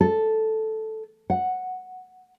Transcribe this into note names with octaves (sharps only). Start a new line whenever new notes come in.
A4
F#5